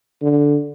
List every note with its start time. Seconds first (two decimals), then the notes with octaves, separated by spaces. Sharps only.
0.22 D3